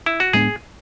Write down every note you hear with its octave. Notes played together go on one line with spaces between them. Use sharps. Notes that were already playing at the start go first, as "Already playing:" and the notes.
E4
F#4
A2 G#3 B3 D4 G#4